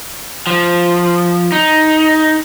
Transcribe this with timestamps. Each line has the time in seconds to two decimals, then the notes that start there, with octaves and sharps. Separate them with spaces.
0.47 F3
1.52 D#4